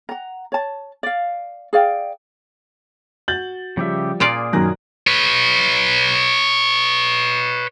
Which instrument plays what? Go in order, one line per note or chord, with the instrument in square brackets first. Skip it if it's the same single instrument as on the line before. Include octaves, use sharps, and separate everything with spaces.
[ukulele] F#5 A#5
C#5 A5
D5 F5
G#4 D5 F5 G5
[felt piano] F#4 [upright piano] G6 A6 F#7
[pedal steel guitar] C#3 G4 E5 [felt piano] F3 G3
[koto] A#2 F4 D5 [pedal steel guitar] A#3 G#4 [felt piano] D7
[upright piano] F#2 D#3 [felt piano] D#6 F#6 A#6
[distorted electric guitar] B4 C#5